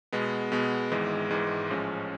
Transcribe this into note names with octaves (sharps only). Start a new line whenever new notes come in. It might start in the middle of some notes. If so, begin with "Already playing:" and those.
B2 G#3 B3
B2 G#3 B3
G#1 G#2 E3 G#3
G#1 G#2 E3 G#3
A1 A2 F3 G#3 C#4